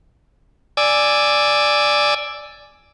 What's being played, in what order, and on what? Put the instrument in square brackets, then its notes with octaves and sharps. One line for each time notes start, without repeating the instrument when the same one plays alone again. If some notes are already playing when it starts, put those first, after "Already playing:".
[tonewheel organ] D5 G#5 D6 E6